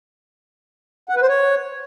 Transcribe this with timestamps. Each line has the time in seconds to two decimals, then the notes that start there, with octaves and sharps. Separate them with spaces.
1.09 F#5
1.16 B4
1.22 C5
1.29 C#5